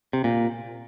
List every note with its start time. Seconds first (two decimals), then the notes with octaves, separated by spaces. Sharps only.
0.13 C3
0.24 A#2